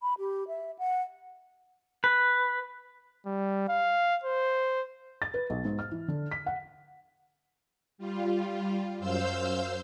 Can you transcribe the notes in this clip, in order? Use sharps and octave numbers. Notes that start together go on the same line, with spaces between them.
B5
G4
E5
F#5
B4
G3
F5
C5
A6
B4
B1
G#2
F6
E3
D3
B6
F#5
G3 F4
F#2 C5 F5 E6 G6